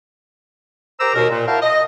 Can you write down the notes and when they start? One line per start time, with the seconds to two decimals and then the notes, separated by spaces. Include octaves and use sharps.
1.00 G4 A#4 C5 A#5 D6 E6
1.15 D#2 B2 A#4
1.30 A#2
1.48 E4 F#4 A#4 F5 G5 A5
1.62 D#5